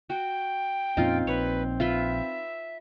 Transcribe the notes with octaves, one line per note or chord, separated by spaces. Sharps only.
F#4 G5
F2 A#2 C4 C#4 D#4 F4
A#1 B4 C#5
F4 B4 E5 G5